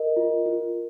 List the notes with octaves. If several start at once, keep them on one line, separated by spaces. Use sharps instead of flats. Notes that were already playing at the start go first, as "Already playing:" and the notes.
Already playing: A#4 D#5
F4
F4